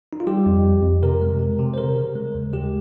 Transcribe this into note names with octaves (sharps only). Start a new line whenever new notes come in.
D#4
F4
G3 G4
F2
F2
F2
C3 A#4
G#3
C3
C3
C5
C#3 A#4
C#3
G#3
D#2
G#3 G4